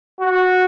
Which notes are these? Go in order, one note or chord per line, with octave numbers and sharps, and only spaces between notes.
F#4